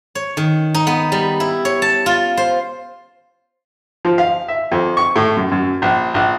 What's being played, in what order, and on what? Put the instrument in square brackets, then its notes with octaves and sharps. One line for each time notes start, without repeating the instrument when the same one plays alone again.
[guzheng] C#5
D#3
D#4
B3
G3
E4
C#5
A5
F4
C5
[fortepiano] F3
F5
E5
F2
C#6
A2
F#2
F#2
A#1
A#1